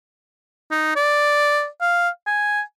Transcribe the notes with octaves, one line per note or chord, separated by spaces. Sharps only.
D#4
D5
F5
G#5